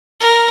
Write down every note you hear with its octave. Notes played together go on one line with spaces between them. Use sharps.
A#4